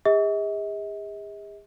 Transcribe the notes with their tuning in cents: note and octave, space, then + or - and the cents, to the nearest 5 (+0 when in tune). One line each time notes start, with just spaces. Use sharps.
G#4 -45 D#5 +45